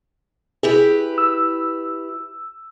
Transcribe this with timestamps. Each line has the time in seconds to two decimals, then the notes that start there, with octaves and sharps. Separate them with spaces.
0.63 E4 G4 G#4 B4
1.18 E6